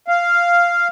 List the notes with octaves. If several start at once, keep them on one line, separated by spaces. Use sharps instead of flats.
F5